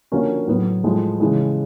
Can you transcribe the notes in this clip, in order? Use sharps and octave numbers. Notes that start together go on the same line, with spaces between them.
D3 F3 A#3 C#4 F#4
A2 F#3 B3
A2 F3 G#3
C#3 E3 G#3